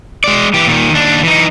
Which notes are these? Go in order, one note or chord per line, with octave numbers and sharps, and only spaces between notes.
G#3 D5
E3 G4
A#2 D#3
D#2 D4
E3 D#4